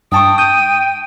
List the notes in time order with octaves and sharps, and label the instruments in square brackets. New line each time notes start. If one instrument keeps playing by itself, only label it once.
[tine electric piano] G2 A5 C#6 [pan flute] G5 [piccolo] D#6
[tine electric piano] D#6 G6 [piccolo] D#7